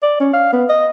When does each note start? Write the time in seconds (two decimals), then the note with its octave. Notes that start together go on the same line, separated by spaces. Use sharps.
0.03 D5
0.20 C#4
0.33 F5
0.52 B3
0.69 D#5